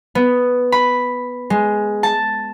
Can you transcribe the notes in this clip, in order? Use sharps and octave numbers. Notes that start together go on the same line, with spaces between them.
B3
B5
G#3
A5